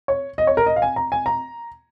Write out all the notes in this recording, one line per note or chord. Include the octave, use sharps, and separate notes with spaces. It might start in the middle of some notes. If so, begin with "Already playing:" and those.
C#5
D#5
C#5
A#4
D#5
F5
G#5
A#5
G#5
A#5